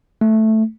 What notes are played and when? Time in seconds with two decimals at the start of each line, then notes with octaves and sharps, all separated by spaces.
0.21 A3